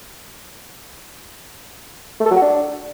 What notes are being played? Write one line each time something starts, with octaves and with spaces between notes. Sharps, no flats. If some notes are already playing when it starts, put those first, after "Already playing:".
A3
A4
F#3
F#4
D4